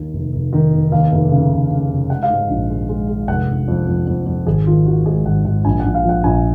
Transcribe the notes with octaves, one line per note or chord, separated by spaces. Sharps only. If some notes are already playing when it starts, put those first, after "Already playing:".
Already playing: D#2 D#3
F1
F1
D#3
F1
D#2 F5
F1
C#3
F1
C#3
F1
G#3 F#5
F5
G#2
F#5
A#1
G#3
G#3
G#3
F1 F#5
F1
F2
F2
F2
F2
G#1 G#4
D#3 F4
D#3 F#4
G#2 G#4
G#1 F#5
G#1 F#5
A#1 G#5
A#1 F#5
F5
F3 F#5
A#1 G#5